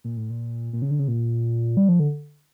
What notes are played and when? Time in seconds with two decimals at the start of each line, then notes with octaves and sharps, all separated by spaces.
0.04 A#2
0.17 A2
0.30 A#2
0.73 A#2
0.82 C#3
0.91 D3
0.99 C#3
1.08 A#2
1.77 G3
1.89 F3
2.00 D3